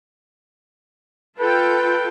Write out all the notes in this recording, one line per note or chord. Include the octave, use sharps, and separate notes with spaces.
F4 A4 B4 G5